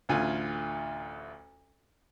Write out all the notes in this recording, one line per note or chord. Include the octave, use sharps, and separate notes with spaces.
A1 D2 F4 G#5